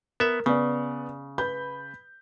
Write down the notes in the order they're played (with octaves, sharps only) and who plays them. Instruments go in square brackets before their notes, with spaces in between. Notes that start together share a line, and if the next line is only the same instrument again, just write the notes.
[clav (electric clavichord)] B3 E5 [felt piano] A#4
[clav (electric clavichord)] C#3 [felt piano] B3 D5
[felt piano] B4 B5 G6